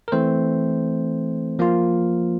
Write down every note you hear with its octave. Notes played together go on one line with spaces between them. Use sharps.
A#4
E3 A3 C4 C5
F3 A#3 F4